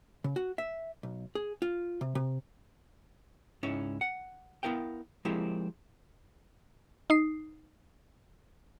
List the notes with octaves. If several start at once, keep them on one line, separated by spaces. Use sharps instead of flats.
C#3
F#4
E5
B1
G#4
F4
C3
C3
C#2 G#2 C#4 E4 C#5
F#5
B3 E4 A#4 F5 G5
F3 G#3 A#3 C4 E4 G4
D#4 D#6 C7